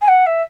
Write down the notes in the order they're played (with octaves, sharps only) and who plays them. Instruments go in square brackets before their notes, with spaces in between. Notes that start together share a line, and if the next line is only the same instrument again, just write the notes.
[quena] G#5
F#5
E5